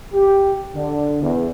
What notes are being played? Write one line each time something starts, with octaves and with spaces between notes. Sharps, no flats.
G4
D3
E2